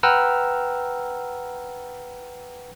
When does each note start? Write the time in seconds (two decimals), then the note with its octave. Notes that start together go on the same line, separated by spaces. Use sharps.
0.03 B4 F#5 G5 A#5 E6 F6